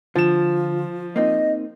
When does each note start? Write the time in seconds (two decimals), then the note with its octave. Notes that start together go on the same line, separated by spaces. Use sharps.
0.15 D3 F3 F4 E7
1.16 A#3 C4 D#4 D#5